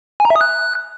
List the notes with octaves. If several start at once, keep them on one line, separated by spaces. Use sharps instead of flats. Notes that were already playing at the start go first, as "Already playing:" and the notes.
G#5
A#5
E5
D#6
F#6